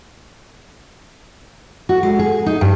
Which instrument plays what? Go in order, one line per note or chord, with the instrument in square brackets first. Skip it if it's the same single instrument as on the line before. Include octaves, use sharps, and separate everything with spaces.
[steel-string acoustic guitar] F#4
G#3
G#4
D#4
G2